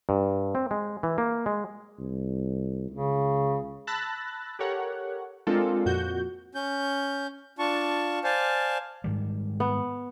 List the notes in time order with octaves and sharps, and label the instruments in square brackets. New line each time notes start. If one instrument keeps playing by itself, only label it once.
[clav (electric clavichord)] G2
C4
G#3
E3
A#3
G#3
[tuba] C2
[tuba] C#2 [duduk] C#3
[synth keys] A5 B5 E6 F#6 A6 A#6
G4 A4 A#4 C#5 F#5
G#3 C4 D4 F4 A4 A#4
F2 A#2 F#4 G6
[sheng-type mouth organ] C#4 G6
D4 F4 A5 C#6
C5 D5 F5 G#5 A5
[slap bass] G#2 D#3 G3
[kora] B3